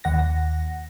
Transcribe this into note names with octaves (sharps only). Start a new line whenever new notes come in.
D#2 F#5 A#6